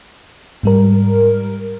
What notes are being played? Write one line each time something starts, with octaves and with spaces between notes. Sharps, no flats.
G#2 G3 A#4